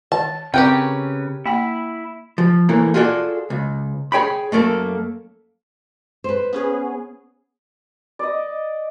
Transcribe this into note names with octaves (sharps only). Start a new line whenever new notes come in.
D#3 A5
C#3 C4 C#4 G4 A#4 B4 G5
A#3 E4 F#5 B5
F3
A2 E3 A3 A#3
F4 F#4 G#4 A4 D5
C#2
G#4 C#5 G5 B5
F#2 A3 A#3 A4
B4 C5
B3 C#4 G#4
D5 D#5